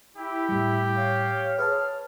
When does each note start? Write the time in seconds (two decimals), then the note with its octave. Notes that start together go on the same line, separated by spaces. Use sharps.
0.17 E4 G4
0.49 A2 G3
0.97 C#5 F5
1.58 G#4 B4 C#5 A5 F6